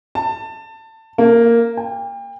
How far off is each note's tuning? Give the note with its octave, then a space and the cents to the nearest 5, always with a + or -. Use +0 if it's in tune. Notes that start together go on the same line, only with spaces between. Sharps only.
A5 +20
A#3 -5
G5 +35